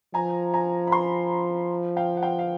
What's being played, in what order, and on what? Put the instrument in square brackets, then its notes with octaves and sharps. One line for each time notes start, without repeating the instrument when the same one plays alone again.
[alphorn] F3 [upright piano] G#5 A#5
[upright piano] G#5 A#5
B5
A#5 C6
F5 G5
F#5
F5 G5
F5